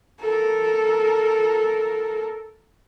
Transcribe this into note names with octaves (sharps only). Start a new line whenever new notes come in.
A4 A#4